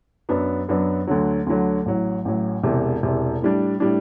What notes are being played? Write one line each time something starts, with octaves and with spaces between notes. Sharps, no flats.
F#2 F#3 B3 D4
F#2 F#3 B3 D4
D2 D3 F#3
D2 D3 F#3
A1 A2 F#3
A1 A2 F#3
E1 E2 C3
E1 E2 C3
A2 G3 D4
A2 G3 D4